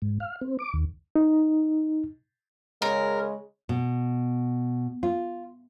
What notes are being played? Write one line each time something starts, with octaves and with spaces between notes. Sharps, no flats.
G#2
F5
C4
D6
D#2
D#4
C#3 G#3 A#4
B2
F4